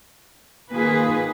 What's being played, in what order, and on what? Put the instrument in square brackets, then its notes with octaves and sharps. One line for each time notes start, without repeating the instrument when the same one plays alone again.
[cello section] D#3 A#3 F4 G#4 B4